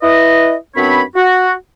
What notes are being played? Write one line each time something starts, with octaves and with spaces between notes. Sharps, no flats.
E4 B4 D#5
F#2 B3 C4 D4 C#5 B5
F#4